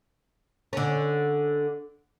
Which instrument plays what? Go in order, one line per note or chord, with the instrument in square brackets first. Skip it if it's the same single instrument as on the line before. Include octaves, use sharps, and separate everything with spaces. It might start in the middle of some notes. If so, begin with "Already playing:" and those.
[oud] D3 C#4